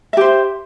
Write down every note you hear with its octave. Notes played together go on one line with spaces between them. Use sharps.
G4 C5 E5